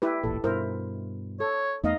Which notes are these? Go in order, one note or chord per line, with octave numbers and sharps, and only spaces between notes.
E4 G4 B4
D#1 A1 A#2 A4
G2 B2 E4 A#4 C5
A4 C#5
E2 A3 B3 D#4 D#5 F5